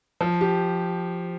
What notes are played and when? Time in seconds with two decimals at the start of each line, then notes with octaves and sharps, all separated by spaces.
0.21 F3
0.41 G4